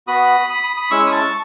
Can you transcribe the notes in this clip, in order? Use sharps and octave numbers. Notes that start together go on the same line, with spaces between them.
B3 F#4 B5 D#6
B5 D#6
B5 D#6
B5 D#6
G#3 C#4 E4 C#6 E6
D#6
A5 C#6